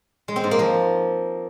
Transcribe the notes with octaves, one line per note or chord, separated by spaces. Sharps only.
G#3
C4
G#2
A#3
F3